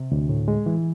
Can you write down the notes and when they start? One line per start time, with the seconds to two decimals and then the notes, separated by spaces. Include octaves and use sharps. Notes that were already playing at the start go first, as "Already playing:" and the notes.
Already playing: C3
0.12 D2
0.29 A2
0.48 G#3
0.66 E3